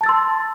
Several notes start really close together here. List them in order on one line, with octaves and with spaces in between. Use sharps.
A5 A6 E6 C6